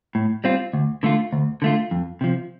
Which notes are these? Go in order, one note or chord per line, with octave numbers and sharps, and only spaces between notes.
A2
G3 C4 F4
D2
D3 A3 F4
D2
D3 A3 F4
F2
C3 F3